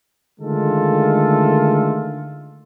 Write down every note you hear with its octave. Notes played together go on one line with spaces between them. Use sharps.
D3 D#3 G#3 A3 F4 A4